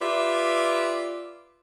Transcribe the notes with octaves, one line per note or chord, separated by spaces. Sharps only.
F4 G4 B4 D5 E5